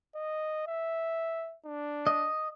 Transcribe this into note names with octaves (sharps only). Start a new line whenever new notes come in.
D#5
E5
D4
D#5